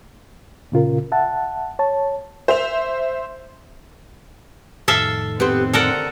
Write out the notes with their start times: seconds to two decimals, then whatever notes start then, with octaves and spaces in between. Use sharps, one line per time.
0.72 A#2 C#3 F4 A#4
1.12 E5 F#5 A5
1.79 C#5 A5
2.48 C5 E5 F7
4.88 F2 A2 D#3 A4 E5 F5
5.40 B3 C4 G4 C5
5.73 D3 A4 A#4 F#5